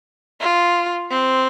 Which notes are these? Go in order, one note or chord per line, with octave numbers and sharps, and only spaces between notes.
F4
C4